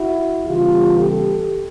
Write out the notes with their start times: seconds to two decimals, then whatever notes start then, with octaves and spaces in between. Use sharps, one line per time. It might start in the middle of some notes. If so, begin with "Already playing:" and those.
Already playing: E4 F#4
0.45 C#3 E3 G3 B3 F4 G4
0.98 G4 A4